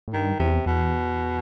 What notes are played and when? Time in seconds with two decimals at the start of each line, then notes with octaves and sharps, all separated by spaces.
0.08 A2
0.13 G2 D#3
0.39 E2 C3
0.66 E2 B2